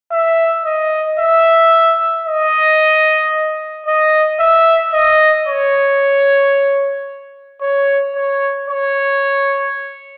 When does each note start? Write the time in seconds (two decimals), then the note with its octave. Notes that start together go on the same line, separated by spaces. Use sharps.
0.12 E5
0.65 D#5
1.19 E5
2.26 D#5
3.87 D#5
4.40 E5
4.94 D#5
5.47 C#5
7.61 C#5
8.15 C#5
8.69 C#5